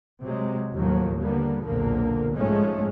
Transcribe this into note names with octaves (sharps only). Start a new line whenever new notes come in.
C3 F#3 G#3
D#2 A2 F3 F#3 A#3
D3 G3 A#3 B3
B1 E2 A#2 D3 F3 A#3
G#2 F3 G#3 A3 C#4